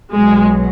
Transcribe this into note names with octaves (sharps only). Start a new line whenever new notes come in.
B1 B2 F#3 G#3